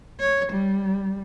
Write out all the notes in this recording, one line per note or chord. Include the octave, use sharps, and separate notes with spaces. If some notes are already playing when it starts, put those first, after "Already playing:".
C#5
G3